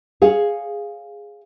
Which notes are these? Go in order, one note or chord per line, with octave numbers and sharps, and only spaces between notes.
G#4 C#5 F5